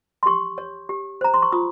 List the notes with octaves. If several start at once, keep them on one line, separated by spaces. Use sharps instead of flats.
C6
G4 C#6
C#5
G4
C5 A#5
C6
C#6
F4 D#6